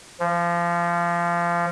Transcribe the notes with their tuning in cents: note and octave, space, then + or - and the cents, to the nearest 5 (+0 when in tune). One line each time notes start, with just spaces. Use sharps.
F3 -25